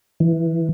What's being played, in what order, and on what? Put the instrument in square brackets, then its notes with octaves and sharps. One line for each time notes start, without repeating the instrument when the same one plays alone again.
[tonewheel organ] E3